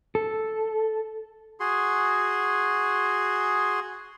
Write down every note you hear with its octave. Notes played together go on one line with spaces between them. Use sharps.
A4
F#4 G#4 C6